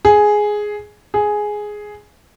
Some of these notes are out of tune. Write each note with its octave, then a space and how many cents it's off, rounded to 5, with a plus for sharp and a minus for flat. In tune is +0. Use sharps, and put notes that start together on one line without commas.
G#4 +5
G#4 +5